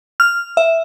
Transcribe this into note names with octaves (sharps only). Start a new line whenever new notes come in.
F6
E5